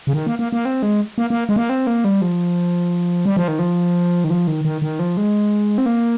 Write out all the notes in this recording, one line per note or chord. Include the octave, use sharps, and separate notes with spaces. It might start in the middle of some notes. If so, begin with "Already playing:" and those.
C#3
D#3
A#3
A#3
A#3
C4
G#3
A#3
A#3
G#3
A#3
C4
A#3
G3
F3
G3
F3
D#3
F3
D#3
F3
D#3
D#3
D#3
F3
G#3
C4
A#3